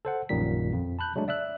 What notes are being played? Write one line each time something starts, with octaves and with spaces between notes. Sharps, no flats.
A4 C5 F#5
A#1 F#2 A#2 D#3 G3 B6
F2
A5 B5 F#6 G6
F#3 G#3 A3 D4
D5 E5 E6 F#6